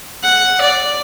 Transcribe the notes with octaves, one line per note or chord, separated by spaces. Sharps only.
F#5
D5